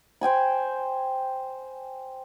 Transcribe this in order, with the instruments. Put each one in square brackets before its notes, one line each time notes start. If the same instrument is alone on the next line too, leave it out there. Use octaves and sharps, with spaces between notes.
[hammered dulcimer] C5 G5 G#5 B5